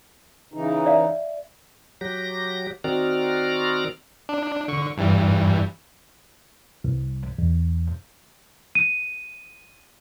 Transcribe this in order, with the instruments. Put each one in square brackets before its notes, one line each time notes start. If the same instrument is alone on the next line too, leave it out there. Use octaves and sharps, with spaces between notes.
[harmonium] C#3 E3 D#4
[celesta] D5 E5 F5
[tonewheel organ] F#3 G4 A#6
D#3 C4 F#4 D5 A#5 F6
[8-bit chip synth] D4
D3 C#6
G2 E3 G3
[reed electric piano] C2
E2
[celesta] D#7